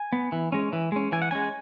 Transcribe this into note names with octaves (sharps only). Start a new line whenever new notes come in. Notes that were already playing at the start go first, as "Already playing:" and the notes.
Already playing: G#5
B3
E3
G#3 C#4
E3
G#3 C#4
E3 G#5
F#5
G#3 C#4 G#5